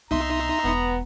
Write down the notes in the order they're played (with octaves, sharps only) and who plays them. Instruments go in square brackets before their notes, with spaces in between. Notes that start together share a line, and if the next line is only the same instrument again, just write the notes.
[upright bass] C2 B2 [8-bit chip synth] D#4 E5 C6 [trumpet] A#5
[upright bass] E1 [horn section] B3